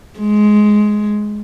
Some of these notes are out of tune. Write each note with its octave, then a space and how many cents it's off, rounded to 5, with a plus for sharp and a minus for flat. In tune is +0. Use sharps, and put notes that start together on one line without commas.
G#3 +10